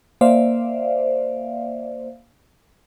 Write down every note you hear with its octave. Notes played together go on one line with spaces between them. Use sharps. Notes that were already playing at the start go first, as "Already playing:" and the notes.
A#3 C5 D5 E5 F5